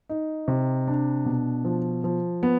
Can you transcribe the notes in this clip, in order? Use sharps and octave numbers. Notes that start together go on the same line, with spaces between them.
D#4
C3
D4
B2
F3
F3
B3